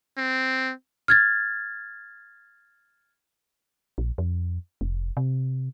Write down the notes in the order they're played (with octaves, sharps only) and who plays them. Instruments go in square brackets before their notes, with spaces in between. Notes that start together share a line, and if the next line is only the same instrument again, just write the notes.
[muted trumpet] C4
[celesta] F6 G#6 A6
[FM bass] A#1
F2
F1
C3